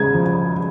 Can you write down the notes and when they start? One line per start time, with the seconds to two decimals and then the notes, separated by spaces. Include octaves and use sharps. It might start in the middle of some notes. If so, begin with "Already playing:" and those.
Already playing: C#3 G#3 G#6
0.14 F3